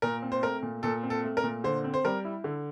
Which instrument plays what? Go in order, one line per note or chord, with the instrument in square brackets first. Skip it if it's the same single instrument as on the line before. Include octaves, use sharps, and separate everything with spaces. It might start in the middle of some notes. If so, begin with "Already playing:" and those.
[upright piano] A#2 [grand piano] A#4
[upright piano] C4
[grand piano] C5
[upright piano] A3 [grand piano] A#4
[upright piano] A#2
[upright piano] A#2 [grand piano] A4
[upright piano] C4
[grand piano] A4
[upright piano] A3
[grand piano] A#4
[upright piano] A#2
[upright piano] D3 [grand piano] C5
[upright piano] C4
[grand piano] C5
[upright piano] G3 [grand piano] A#4
[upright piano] E4
D3